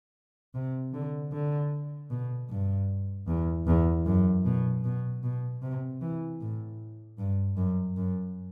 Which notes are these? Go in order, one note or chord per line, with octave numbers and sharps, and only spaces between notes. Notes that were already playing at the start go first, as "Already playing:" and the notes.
C3
D3
D3
B2
G2
E2
E2
F#2
B2
B2
B2
C3
E3
A2
G2
F#2
F#2